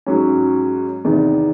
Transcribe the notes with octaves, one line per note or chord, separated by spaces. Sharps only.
G#2 F#3 C#4
E2 C3 D#3